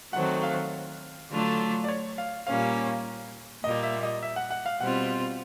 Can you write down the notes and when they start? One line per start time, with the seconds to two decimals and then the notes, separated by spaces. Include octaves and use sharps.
0.13 D#3 F#3 A3 C4 F#5
0.43 F5
1.30 D3 F#3 A3 D4 F4
1.84 D5
1.88 C#5
2.18 F5
2.47 A#2 G3 A#3 C#4 F5
3.63 A#2 G3 A#3 D#5
3.83 E5
4.03 D#5
4.22 E5
4.36 F#5
4.51 F#5
4.66 F5
4.80 B2 G3 C4 F4 F#5